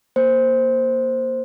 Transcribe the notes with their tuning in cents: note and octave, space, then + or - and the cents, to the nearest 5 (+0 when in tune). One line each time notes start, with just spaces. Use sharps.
A#3 +10 C5 +0